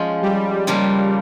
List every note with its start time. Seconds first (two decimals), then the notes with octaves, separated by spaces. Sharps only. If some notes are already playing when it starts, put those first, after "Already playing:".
Already playing: F3 G#3 C#4
0.22 G3
0.67 C#3 F3 G3 A#3